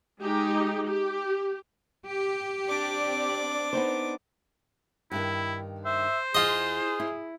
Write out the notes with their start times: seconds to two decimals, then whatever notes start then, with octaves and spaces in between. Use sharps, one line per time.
0.22 G#3 D#4 G4
0.87 G4
2.07 G4
2.68 C4 D4 D5 D6
3.73 B3 D#4 C5
5.11 G2 D#3 E4
5.85 C5 E5
6.35 E2 F4 G#4 D#5
7.00 E4